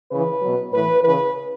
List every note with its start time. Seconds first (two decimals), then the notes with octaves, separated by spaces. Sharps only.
0.11 C#3 E3 B4
0.42 B2 F#3
0.73 A2 E3 B4
1.03 C#3 E3 B4